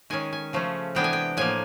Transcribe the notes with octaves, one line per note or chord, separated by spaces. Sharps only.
D#3 G#3 C#4 G#5
G#5
C#3 F3 A3 C#4
C3 E3 G#3 B3 D4 G5
G#5
G5
A2 F3 A#3 G#5